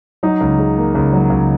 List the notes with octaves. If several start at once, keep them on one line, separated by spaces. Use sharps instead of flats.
F#3 D#4
C#2
C#3
A#3
C#2
F#3
C#2